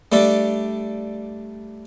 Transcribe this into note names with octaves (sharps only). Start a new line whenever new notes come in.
G3 A3 D4 A4